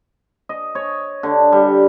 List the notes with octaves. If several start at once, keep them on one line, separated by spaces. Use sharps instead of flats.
D#5
C#5
D3
G3